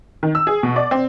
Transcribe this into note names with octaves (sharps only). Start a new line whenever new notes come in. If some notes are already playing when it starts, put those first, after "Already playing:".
D#3
E6
G#4
B2
D5
C4